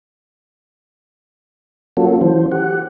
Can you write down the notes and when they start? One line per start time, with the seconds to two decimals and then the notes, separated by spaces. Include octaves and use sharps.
1.97 F#3 A#3 C#4 F4 F#4 A4
2.21 E3 C5
2.52 G4 F#5